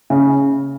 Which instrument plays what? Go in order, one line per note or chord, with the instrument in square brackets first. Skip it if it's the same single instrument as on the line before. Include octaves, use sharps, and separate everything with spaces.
[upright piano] C#3